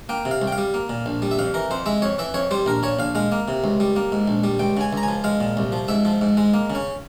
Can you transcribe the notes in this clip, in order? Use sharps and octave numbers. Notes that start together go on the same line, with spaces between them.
A#3 G5
C3
F5
C2
G5
F5
G3
A#3
A#2
A#1
G3
E5
F2 F5
E3 A#4
F2 C5
G#3 E5
F2 C#5
E3 E5
F2 C#5
G3 C5
A#1 A#4
A#2 C#5
A#1 F5
G#3 F5
A#3
C3
C#2
G3
A#3
G#2
A#1
G3
C#2 G5
C#3 G#5
C#2 A#5
G#5
F3
G#3 F5
A#2
C2
F3
G#2 E5
F3
G#2
G#3
A#3
C#3
C#4